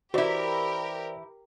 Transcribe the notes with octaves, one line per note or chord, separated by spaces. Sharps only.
E3 E4 F#4 G4 A#4 C5 D5